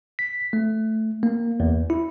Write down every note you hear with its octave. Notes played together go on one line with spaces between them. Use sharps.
B6
A3
A#3
E2
E4